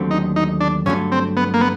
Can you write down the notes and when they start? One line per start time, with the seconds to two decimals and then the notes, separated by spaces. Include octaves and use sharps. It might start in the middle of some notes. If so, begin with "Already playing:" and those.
Already playing: D#2 D3 F#3 A3 C4
0.11 D#4
0.36 D#4
0.60 D4
0.86 G2 D3 F#3 A3 C#4
1.12 C4
1.37 B3
1.54 A#3
1.61 B3